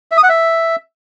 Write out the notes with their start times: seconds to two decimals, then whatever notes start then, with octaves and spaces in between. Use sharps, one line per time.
0.11 E5
0.17 D#6
0.23 F#5
0.29 E5